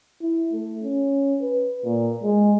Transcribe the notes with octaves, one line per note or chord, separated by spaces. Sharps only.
E4
A3
C#4
B4
A#2
G#3